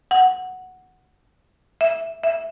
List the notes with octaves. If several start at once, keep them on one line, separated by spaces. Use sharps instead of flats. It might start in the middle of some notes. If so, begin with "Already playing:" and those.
F#5
E5
E5